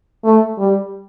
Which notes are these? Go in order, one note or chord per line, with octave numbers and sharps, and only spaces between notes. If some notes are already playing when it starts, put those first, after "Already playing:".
A3
G3